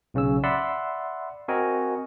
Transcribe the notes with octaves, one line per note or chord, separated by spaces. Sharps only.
B1 C#3 C#4 E6
D5 E5 F#5 B5 C6 E6
C4 F#4 A#4 D#5 G#5